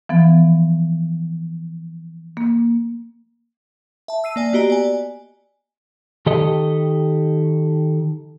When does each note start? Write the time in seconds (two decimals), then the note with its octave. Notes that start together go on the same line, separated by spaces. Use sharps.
0.09 E3 F3 B3
2.37 A#3
4.08 E5 A5
4.24 E6 C7 D#7
4.36 A#3 D5 G#5
4.53 B3 F#4 G4 D#5 A#5
4.70 D5 G#5
6.26 D#3 G4 A4 D#5